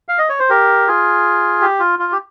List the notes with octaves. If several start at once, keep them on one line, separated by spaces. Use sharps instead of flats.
F5
D#5
C#5
C5
G4 A#4
F4 G#4
G4
F4
F4
G4